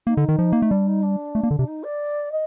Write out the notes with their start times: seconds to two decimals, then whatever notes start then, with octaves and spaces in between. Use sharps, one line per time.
0.06 A#3 D#4
0.17 D3
0.29 D#3
0.39 F3
0.53 A#3
0.62 A3
0.70 G3 D4
0.87 D#4
1.02 D4
1.35 A3
1.43 A#3
1.51 D3
1.59 C3
1.67 D#4
1.83 D5
2.31 D#5